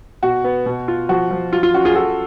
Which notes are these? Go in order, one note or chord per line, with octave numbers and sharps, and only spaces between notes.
B2 F#4
B3
B2
F4
F3 F#4
F3
F#3 F4
F4
C#4 F#4
F4 G#4
F4 F#4 A4